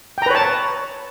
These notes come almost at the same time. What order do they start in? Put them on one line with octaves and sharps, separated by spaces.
G5 A#5 B4 C#5 A5